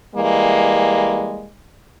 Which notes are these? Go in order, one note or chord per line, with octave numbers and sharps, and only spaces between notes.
E3 G3 G#3 A#3